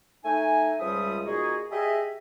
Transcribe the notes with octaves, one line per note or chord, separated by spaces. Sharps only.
A3 D#4 G#5
C#2 F3 G3 G#3 E5 D#6
A#2 D#4 F#4 G#4
G4 G#4 D#5 E5